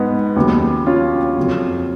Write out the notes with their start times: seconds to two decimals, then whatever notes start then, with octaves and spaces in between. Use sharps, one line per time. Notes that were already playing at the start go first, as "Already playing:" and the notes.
Already playing: G#2 B3 D#4
0.36 D#2 C#3 F#3 B3
0.86 C#4 F4
1.37 F2 C#3 F#3